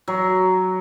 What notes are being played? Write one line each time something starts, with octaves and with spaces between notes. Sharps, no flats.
F#3